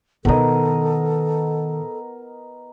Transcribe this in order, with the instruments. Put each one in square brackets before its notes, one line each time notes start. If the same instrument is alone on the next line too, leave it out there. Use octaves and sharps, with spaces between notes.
[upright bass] B2 D#3 [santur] B3 A#4 D#5 [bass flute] A4